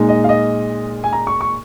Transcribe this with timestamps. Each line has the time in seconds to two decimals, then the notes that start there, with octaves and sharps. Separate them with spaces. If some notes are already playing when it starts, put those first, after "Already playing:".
Already playing: A#2 G#3 D#4
0.09 D#5
0.24 F5
0.29 D#5
1.04 G#5
1.13 A#5
1.27 C#6
1.41 C#6